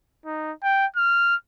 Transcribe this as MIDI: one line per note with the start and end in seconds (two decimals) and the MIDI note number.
0.25 0.53 63
0.63 0.86 79
0.96 1.36 89